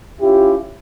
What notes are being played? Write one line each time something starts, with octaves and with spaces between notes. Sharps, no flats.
C#4 E4 F4 G4